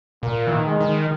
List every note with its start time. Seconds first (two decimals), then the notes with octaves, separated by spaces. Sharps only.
0.22 A#2 A#3
0.47 E3
0.52 D#3
0.66 G#3
0.81 D#3